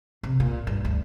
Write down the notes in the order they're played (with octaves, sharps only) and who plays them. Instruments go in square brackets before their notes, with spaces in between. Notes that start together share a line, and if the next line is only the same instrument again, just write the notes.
[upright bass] C3
A#2
G2
D2